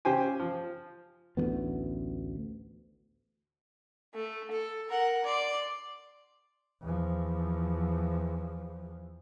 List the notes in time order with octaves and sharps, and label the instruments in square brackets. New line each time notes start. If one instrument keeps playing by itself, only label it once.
[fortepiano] C#3 G4 C5 G5 G#5
F3
[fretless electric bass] A1 D2 F3 B3
[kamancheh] A3
A4
A#4 F#5
D5 C6
[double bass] E2 F3